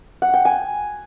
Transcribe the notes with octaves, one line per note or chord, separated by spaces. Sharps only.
F#5
G5
G#5